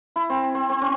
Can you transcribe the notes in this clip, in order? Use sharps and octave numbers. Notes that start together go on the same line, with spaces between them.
E4
C4
C4
C4
C#4